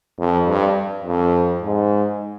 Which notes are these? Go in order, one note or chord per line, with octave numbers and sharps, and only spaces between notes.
F2
G2
F2
G#2